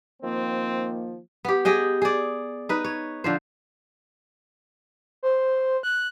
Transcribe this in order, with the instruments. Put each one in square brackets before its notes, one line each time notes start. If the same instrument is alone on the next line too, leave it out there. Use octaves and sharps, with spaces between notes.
[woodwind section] D#3 F3 A#3 [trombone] C4
[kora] B3 G4
G4 G#4 D#5 G5
G#4 D5
D#4 B4
C#5
D3 F3 C5
[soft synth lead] C5
F#6